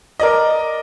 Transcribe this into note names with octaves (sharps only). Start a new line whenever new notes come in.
A#4 D5 D#5